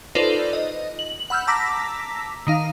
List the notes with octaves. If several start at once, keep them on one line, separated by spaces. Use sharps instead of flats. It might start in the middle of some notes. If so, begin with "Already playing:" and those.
D#4 F4 A4 B4 C5 D5
D#5
F#7
F#5 B5 E6 F6 G6
A5 A#5 D6 E6 A#6 B6
D#3 D#4 F5